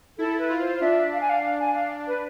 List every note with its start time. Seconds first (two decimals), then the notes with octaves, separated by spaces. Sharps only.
0.18 E4 A4
0.39 B4
0.50 F4
0.60 C5
0.80 D4 E5
1.13 F5
1.21 G#5
1.29 F5
1.43 F5
1.60 G#5
1.75 F5
2.07 B4